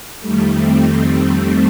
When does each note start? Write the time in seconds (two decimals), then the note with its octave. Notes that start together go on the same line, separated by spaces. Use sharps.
0.21 F2 D#3 G3 A3
0.50 A3 C4